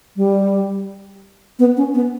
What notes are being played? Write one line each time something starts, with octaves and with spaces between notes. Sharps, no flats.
G3
B3
C#4
B3